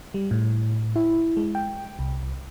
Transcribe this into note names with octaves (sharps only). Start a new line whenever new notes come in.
G3
A2
E4
G#3
G5
C2